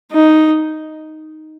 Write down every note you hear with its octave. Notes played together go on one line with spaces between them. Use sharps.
D#4